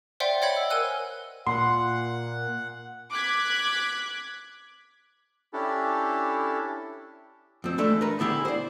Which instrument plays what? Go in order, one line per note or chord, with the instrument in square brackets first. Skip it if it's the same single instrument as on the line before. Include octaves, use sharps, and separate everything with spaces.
[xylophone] C5 D5 E5 F#5 G5 C6
C#5 D#5 E5 F#5 B5 G#6
E6
A#4 F5 G#5 E6 F#6
[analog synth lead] A#2 [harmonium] F#5 [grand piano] C6
[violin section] D6 F#6 G#6 B6
[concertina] C#4 D4 E4 G4 A4
[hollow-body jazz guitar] F2 C4
E3 G#3 A3 D4
A#4 B4
D3 B3 E4 G4 G#4
C5 D5